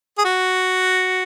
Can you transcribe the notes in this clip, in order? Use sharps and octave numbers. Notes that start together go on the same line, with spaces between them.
G#4
F#4